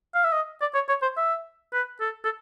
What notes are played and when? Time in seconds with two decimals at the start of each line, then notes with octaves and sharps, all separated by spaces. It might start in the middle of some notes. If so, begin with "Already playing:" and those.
0.15 F5
0.24 E5
0.32 D#5
0.61 D5
0.74 C#5
0.88 C#5
1.02 C5
1.17 E5
1.73 B4
2.00 A4
2.24 A4